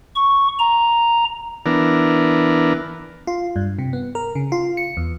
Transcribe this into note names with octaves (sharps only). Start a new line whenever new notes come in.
C#6
A#5
E3 B3 D4 A#4
F4
G2
C3
B3
A#4
C#3
F4
C#7
E2